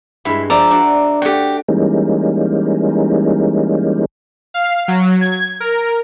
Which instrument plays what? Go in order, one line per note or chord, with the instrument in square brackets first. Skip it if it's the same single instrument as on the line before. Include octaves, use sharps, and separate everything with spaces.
[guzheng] G2 G#3 [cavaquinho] E4
[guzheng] F3 [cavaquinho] D5 E5 A#5
[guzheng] D4 F#4
[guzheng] A3 F#4 [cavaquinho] G4 G5
[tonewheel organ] E3 G3 G#3 A#3 C#4 D#4
[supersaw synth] F5
F#3
G#6
A#4